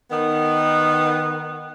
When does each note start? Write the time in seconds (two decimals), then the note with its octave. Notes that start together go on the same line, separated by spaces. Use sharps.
0.11 D#3 B3